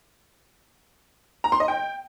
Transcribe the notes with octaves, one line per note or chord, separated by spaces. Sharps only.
A#5
C6
D#5
G5